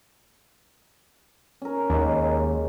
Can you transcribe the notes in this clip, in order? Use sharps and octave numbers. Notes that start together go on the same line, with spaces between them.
C#4 A#4
D#2 G#3 A#3